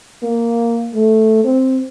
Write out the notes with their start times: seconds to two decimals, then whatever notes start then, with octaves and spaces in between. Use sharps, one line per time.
0.23 A#3
0.95 A3
1.45 C4